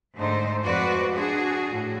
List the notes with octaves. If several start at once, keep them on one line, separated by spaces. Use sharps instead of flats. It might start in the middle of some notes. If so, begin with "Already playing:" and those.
G#2 D3 A3 D#4 C5
F2 G#3 F#4 B4 C5 D5
D4 F#4 G#4
A2 F#4